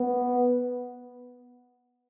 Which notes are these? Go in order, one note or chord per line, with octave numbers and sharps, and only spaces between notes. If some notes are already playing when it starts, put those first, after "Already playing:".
Already playing: B3